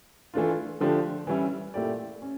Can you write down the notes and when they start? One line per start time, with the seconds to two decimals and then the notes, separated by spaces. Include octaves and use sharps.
0.34 E3 A3 D4 F4
0.80 D3 F3 A3 D4 G4
1.27 E3 G3 C#4 E4
1.74 A#2 A3 E4 G4 D5
2.22 C#4